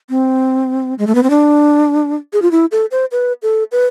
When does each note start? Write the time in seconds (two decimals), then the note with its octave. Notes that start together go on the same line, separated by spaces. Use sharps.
0.10 C4
0.99 G#3
1.07 A3
1.15 B3
1.23 C4
1.30 D4
2.33 G#4
2.42 F4
2.52 E4
2.72 A4
2.91 C5
3.12 B4
3.43 A4
3.72 B4